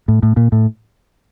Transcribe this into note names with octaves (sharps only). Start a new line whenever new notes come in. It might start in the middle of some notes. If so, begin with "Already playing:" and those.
A2
A2
A#2
A2